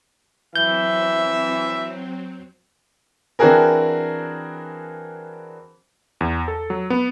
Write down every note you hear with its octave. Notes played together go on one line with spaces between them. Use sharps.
E3 F#3 C4 E5 G6
E3 C4 D4 F#4 G#4 A#4
E2
A4
F#3
B3